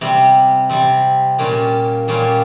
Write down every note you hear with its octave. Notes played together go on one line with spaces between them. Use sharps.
C3 G3 C4
C3 G3 C4
A#2 G3 C#4 F4
A#2 G3 C#4 F4